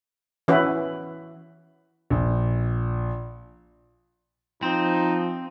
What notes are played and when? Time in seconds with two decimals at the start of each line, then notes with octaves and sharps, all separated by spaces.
0.48 E3 C#4 E4 F#4 B4
2.10 A#1
4.63 F3 C4 D#4